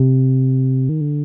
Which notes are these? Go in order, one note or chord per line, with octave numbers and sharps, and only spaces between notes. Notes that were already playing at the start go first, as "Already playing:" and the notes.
Already playing: C3
D#3
D3